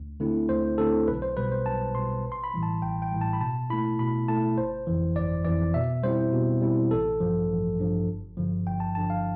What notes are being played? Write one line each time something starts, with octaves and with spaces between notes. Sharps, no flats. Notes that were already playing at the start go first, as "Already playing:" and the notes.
Already playing: D2
D3 A3 C4 E4
D2 C5
D3 A3 C4 E4 A4
B1 B4
C5
B2 G3 B4
C5
B1 A5
B2 G3 C6
A1
C6
B5
A2 E3 G3
A5
A1 G5
G5
A2 E3 G3
A5
B5
B2 A5
A3 E4 B5
B2 B5
A3 E4 A5
G1 C5
F2 E3
G1 D5
F2 E3 D5
B2 E5
G3 C4 E4 C5
B2
G3 C4 E4
A1 A4
G2 F3
A1
G2 F3
G1
G2 D3 F3
G1 G5
A5
G2 D3 F3 A5
F5